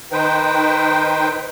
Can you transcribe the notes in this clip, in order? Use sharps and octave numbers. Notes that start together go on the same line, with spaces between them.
D#3 D#4 B4 C5 G5